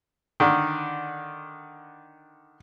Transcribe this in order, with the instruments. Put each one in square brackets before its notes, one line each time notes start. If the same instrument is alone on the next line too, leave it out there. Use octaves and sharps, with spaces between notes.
[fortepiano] D3 D#3